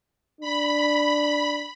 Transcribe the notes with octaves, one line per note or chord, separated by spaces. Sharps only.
D4 B5